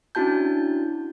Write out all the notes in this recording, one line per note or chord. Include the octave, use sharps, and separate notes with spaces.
C#4 D4 E4 F#4 A5 G6